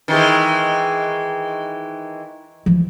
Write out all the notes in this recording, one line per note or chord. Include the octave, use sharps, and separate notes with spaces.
D#3 E3 G#3
E3 F3